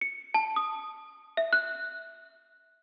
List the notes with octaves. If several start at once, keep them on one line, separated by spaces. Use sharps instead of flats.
C#7
A5
D#6
E5
F#6